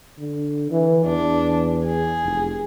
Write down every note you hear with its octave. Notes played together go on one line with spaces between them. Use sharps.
D3
E3
E2 D4
G#4
F1